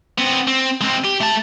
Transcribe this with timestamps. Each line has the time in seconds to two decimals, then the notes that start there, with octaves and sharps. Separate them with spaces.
0.18 B3 C4
0.48 C4
0.81 G#3 C4
1.04 G4
1.20 A3 A5